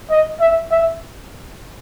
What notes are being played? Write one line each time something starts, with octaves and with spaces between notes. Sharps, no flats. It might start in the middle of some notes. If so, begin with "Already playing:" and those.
D#5
E5
E5